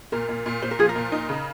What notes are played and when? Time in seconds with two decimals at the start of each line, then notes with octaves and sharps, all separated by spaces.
0.12 A#2 A#4
0.29 A#2
0.46 A#2
0.62 A#2 C5
0.71 A#4
0.79 F3 G#4
0.89 A#4
0.96 A#2
1.12 D#4
1.29 C#3